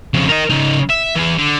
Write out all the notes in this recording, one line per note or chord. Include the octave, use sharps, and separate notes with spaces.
F2 C#3
A#4 D#5
C#3 D#4
E5
E3 G#4
D3